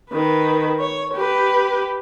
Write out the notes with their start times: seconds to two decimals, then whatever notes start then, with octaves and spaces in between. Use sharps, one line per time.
0.11 D#3 B4
0.80 C#5
1.14 G4 B4